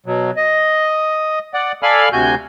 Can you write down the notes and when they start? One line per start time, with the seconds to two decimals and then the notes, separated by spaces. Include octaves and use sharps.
0.06 B2 F#3
0.37 D#5
1.54 D5 F#5
1.83 A4 D5 F5 G#5 B5 F6
2.13 D2 C3 F#4 G#5 G6